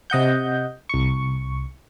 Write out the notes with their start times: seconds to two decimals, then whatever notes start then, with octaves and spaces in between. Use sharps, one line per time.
0.10 C3 D#5 F#5 G6
0.89 C2 C#6